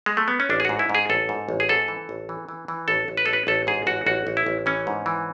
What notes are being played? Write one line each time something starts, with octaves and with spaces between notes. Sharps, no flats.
G#3
A3
B3
C#4
A1 D4
G#4
G#2 F#4
E4
G#2
G#4
A1 A4
G#2
A1
G#4
G#2 A4
E3
A1
E3
E3
E3
A1 A4
A1
B4
A1 A4
B4
A1 A4
G#2 G#4
A1 F#4
A1 F#4
A1
E4
A1
E3 C#4
G#2
E3